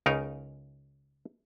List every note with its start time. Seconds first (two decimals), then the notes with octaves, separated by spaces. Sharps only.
0.06 C#2 C#3 D#4 A#4